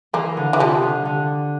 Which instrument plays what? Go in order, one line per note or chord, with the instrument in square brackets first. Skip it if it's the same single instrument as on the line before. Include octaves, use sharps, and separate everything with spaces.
[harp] E3 [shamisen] A#3
[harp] D3
[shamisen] E3
[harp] C3 [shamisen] F3
[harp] D3
D3